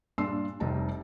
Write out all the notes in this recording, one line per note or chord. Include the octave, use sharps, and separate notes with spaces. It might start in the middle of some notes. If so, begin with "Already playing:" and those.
G2 A#2 D4 C6 E6 C7
F1 C3 G3 D#4 A5